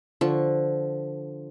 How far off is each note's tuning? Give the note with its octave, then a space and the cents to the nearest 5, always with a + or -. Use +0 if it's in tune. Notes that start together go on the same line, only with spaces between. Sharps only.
D3 +0 F3 -5 C#6 +0